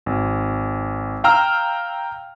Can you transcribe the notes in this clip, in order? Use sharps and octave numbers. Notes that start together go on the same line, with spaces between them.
G#1
F5 G5 A#5 E6 F6